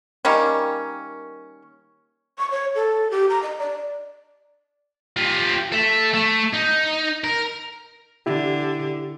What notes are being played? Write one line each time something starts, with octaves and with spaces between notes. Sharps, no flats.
D#3 G3 A#3 C#4
C#6
C#5
A4
G4
A#5
D#5
D5
F4 G4
A4 E5
A3
D#4
A#4
D3 E4 G4